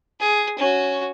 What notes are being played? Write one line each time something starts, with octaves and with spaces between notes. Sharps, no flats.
G#4
C#4 F#4